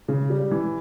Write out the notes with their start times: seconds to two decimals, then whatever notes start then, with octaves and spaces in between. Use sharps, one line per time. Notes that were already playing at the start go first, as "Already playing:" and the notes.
0.08 C#3
0.30 G3
0.51 E3